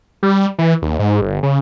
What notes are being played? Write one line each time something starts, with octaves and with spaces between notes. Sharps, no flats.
G3
E3
D#2
G#2
G1
C#3